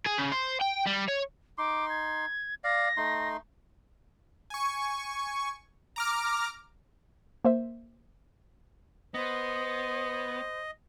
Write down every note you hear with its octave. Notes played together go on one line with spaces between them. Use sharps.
G#4
C#3
C5
G5
G3
C#5
D#4 C6 D6
G#6
D5 F5 A#6
A3 D#4 C6
G#5 C#6
A#5 D6 F6
A#3 C5 E5
B3 C5 D#5